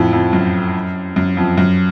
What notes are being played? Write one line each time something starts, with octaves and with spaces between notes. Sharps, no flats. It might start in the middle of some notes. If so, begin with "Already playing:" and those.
Already playing: F2 A2
F2
F#2
F#2
F2
F#2